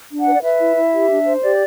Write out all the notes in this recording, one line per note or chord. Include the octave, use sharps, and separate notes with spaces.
D4
F#5
B4
D5
B4 E5
E4
E4
G4
D4
C5
G4 D5